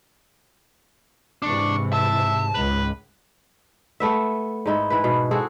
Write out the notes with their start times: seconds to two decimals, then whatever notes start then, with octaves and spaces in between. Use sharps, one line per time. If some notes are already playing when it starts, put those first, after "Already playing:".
1.42 G#2 C3 E3 D4 C#6
1.93 E5 A5
2.54 C#2 G#2 B4
4.00 A3 B3 E5
4.66 G#2 D#4 E4
4.90 E3 B4
5.04 B2
5.31 C4 F#4 G#4 A4